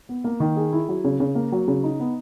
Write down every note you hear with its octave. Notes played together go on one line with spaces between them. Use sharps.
B3
A#3
D#3
G#4
E4
F#3
C#3
C#3
A#3
F#3
C#3
D#4
B3